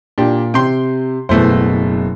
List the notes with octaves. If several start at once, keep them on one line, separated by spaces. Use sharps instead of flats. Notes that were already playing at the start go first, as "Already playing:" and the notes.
A#2 D4 G4
C3 G5 C6
F#1 B2 E3 A3 C5